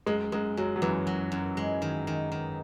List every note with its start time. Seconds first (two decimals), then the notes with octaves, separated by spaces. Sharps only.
0.06 F#2 G#3
0.32 F#2 G#3
0.57 F#2 F#3
0.76 F#3
0.82 F#2 E3
1.07 F#3
1.32 F#2
1.57 G#3
1.82 D#3
2.07 D#3
2.32 D#3